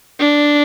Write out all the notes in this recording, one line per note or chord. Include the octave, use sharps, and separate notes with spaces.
D4